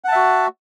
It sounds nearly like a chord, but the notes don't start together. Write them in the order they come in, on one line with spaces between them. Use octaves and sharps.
F#5 A5 E5 F#4